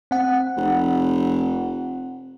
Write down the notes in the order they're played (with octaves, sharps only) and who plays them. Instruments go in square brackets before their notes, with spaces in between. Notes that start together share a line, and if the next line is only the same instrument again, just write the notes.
[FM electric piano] C4 F#5
[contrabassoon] F1